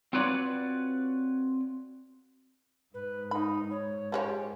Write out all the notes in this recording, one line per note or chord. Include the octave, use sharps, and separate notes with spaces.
C4 F4 F#4 B4 C#5 D5
G#2 B4
D#4 B5
C#5
F3 G#3 G4 C#5